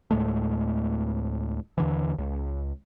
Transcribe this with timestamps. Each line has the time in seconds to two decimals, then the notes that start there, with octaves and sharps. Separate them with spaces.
0.11 D2 A2 G#3 A3
1.78 D#2 D3 E3
2.18 C#2